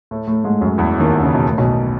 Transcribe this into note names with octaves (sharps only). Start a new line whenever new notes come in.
A2 A3
A2 A3
G#2 G#3
F#2 F#3
E2 E3
D#2 D#3
C#3
B2
A2
B1 B2